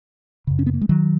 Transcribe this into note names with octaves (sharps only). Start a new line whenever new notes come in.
F#2 C#3
C#4
B3
A#3
G#3
D#3 F#3